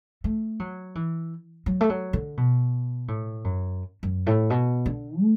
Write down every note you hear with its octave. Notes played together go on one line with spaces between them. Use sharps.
A3
F#3
E3
F#3
A3
F#3
D3
B2
A2
F#2
F#2
A2
B2
D3
A3